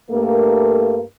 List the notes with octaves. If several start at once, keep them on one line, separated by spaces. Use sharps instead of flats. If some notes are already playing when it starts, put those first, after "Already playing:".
G2 A3 A#3